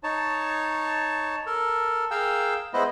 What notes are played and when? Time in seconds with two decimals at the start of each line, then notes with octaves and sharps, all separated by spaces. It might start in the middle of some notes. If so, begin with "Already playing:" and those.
0.03 D#4 C#5 A5
1.46 A4 A#4
2.11 G#4 A#4 F5 G5 E6
2.73 G#3 B3 E4 B4 C5 D#5